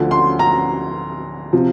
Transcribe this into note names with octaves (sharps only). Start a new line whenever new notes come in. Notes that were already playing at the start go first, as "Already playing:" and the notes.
Already playing: D2 D3 F3
C6
A#5
C3 F3